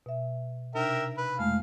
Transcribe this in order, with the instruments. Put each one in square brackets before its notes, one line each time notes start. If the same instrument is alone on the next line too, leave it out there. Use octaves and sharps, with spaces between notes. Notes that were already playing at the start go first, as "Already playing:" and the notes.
[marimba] B2 E5
[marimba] C3 D4 D#4 [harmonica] A#4 E5 G5
[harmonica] B4
[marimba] F2 G#3 A3 [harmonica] F5